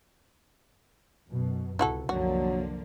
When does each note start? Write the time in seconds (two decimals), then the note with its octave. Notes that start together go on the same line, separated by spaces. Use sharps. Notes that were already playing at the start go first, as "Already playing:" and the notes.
1.28 F#2 B2
1.79 C#2 C3 E4 F#4 A4
2.09 C2 F#2 D3 F3 F#3 A#3 F#4